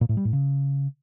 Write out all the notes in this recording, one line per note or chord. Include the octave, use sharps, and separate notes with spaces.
A#2
A2
G3
A2
C#3